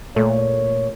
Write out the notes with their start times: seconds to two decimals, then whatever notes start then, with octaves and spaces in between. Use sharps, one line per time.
0.16 A#2 A3 C#5